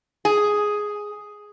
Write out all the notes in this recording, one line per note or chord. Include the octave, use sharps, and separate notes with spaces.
G#4